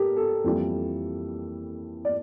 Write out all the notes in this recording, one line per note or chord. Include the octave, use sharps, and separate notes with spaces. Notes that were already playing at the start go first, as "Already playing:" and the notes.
Already playing: G4 A4 A#4
A4
F2 E3 G3 A#3
D5